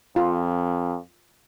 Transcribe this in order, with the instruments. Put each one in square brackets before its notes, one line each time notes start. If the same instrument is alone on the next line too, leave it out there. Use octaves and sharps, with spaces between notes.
[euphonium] F2 [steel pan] F4